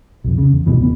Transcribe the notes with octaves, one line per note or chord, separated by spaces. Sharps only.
B1 F2
C#3
E2
D1 A1 B2 E3
D#1 B3